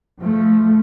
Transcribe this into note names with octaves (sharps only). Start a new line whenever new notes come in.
F3 A3